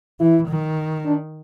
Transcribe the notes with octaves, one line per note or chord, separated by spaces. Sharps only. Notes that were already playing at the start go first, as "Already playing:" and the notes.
E3 E4
D#3
D4